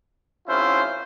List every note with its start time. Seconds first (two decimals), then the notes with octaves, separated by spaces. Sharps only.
0.48 G#1 C#4 E4 F4 C5